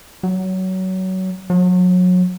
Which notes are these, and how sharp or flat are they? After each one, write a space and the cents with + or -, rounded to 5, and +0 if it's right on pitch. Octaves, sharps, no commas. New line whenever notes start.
F#3 +20
F#3 -30